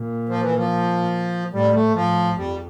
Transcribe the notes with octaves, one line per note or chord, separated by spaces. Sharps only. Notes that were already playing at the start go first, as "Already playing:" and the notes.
Already playing: A#2
F3
E3
F3
A2 G3
A3
A2 F3
F2 G3